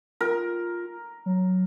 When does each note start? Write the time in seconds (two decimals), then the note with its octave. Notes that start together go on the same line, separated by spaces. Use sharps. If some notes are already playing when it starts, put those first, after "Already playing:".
0.21 F4 A#4
1.26 F#3